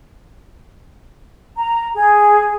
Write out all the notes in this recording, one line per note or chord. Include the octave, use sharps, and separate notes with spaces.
A#5
G#4